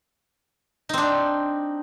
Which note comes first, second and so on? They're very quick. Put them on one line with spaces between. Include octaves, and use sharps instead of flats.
D#4 C4 D4